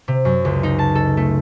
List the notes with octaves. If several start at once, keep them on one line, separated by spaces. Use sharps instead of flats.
C3
F#2
C#2
D#4
A5
A4
A3